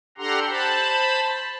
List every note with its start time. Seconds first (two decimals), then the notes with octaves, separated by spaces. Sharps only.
0.18 D4 G4 A4 F#5 A#5 C6
0.49 C5 A5 B5